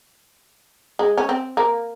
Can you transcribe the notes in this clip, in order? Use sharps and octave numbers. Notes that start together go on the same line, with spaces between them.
G#3
C#4
C4
A#3